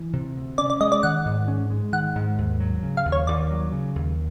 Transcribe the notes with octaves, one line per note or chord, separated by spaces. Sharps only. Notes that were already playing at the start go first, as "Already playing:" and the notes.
Already playing: E3
C3
D2
C#4 D5
D5
G#3 D#5
D5
D#3 F#5
G#2
C#4
G#3
D#3 F#5
G#2
D#2
F#3
C#3
F5
D#2
C#5
D#2 D5
F#3
C#3
D#2